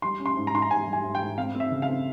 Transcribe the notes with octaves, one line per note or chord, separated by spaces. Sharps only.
G3 C6
C#4
C6
G#2
A#5
G#2 C6
A#5
G#2 G#5
G3
G#5
G#2
G5
G#2
C4 F5
C4
E5
C#3
F5
C4